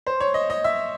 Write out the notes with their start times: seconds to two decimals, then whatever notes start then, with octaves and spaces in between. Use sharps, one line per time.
0.07 C5
0.20 C#5
0.34 D#5
0.50 D#5
0.64 E5